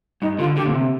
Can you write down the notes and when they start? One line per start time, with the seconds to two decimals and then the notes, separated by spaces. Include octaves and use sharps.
0.22 G2 D#4
0.39 D3 F4
0.56 D3 G4
0.66 A#2
0.74 C3